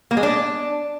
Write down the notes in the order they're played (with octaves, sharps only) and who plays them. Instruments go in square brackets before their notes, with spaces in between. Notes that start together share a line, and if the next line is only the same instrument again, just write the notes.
[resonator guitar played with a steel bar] A#3
G#3
D4